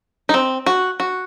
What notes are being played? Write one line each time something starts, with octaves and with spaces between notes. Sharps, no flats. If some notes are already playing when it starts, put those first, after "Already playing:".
D#4
C4
F#4
F#4